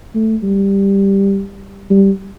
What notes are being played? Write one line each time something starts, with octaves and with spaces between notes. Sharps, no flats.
A3
G3
G3